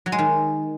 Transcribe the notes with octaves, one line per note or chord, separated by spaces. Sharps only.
F#3
G#3
D#3